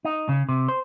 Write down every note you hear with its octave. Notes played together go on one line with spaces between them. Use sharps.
D#4
C#3
C3
C5